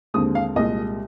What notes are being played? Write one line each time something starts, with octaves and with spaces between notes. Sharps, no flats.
D#2 D3 G#3 C4 D#6
F5
C2 A#2 G#3 D#5